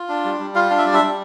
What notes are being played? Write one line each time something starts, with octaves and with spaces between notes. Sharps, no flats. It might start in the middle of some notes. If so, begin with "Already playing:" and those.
Already playing: F4
D4
G3
G3
F4 F5
D4 F5
E5
G3 D5
E5
G3